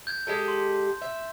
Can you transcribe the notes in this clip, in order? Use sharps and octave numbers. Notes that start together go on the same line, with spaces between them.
G6 G#6
G#3 G4 A4
C6
E5